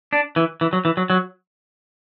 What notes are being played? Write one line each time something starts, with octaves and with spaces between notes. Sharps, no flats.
D4
E3
E3
F#3
E3
F#3
F#3